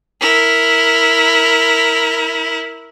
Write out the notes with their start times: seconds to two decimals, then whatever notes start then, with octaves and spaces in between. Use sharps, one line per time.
0.21 E4 A#4